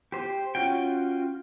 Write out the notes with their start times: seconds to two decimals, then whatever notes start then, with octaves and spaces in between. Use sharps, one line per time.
0.12 G4 C5
0.55 C#4 F4 F#4 G5